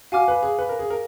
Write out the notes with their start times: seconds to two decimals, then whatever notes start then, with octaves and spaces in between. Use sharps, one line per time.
0.12 F#4 F5 G#5 D6 F6
0.28 B4
0.43 G#4
0.59 B4
0.69 A#4
0.79 G#4
0.90 A#4